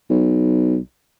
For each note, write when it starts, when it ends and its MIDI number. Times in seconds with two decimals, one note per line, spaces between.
0.10 0.79 35